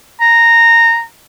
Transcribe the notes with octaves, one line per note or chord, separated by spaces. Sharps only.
A#5